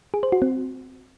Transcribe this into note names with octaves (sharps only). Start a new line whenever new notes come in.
G#4
C5
F#4
C4